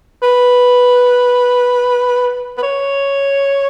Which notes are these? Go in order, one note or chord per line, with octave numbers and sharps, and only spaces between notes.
B4
B4
C#5